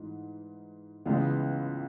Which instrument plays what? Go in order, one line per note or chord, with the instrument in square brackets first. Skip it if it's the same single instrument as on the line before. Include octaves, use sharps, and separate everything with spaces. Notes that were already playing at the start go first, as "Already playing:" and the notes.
Already playing: [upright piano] G#2 E3
C#2 C#3 E3 G#3 B3